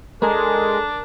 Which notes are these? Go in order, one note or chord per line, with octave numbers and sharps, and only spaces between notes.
G#3 D4 A4 A#4